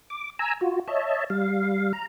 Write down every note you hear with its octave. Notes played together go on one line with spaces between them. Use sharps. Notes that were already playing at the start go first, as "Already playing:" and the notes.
D6
G#5 A#5 E6
F4 F#4
C#5 D#5 E5 A5
G3 F5
A#5